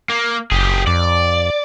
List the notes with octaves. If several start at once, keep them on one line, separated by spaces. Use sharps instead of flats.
A#3
F#1 G4 G#4
F2 D5